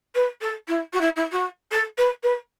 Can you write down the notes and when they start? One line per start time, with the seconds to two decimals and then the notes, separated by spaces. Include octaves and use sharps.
0.15 B4
0.41 A4
0.68 E4
0.93 F#4
1.01 E4
1.16 E4
1.32 F#4
1.71 A4
1.98 B4
2.23 B4